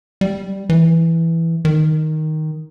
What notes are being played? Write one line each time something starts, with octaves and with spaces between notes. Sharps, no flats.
G3
E3
D#3